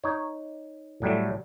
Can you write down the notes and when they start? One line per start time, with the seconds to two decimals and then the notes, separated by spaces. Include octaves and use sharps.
0.04 D#4 C#5
1.02 A2 F#3 G3 A3